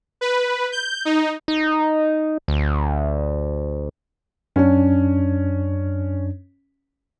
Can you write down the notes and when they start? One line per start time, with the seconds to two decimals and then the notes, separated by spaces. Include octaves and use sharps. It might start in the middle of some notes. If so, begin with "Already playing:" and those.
0.21 B4
0.72 G6
1.05 D#4
1.48 D#4
2.48 D2
4.56 F#2 C#4 D4